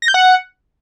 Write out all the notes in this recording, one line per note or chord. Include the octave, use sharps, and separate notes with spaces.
A#6
G6
F#5